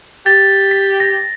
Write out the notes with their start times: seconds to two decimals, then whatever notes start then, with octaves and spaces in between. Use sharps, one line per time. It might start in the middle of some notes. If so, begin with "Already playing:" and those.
0.26 G4 A6
0.71 B6
1.00 A#6